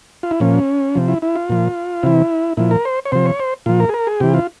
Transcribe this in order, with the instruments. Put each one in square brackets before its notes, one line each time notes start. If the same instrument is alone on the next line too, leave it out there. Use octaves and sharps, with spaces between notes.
[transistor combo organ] F4
E4
A#2 F3 C#4
C3 F3
E4
E4
F4
A#2 F3
C3 E3 E4
A#2 F3 E4
A#4
C5
C#5
C3 F3 C5
C#5
C5
A#2 F3 F4
A#4
G#4
A#4
G#4
C3 E3 G4
F4